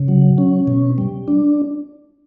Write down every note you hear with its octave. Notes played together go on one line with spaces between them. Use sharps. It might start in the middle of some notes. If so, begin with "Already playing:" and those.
Already playing: C#3
F#3
C#4
B2
G3
D4